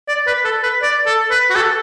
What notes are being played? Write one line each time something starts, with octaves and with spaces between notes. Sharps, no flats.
D5
B4
A4
B4
D5
A4
B4
F#4
A4